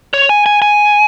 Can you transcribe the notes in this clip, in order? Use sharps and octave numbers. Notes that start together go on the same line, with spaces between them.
C#5
G#5
G#5
G#5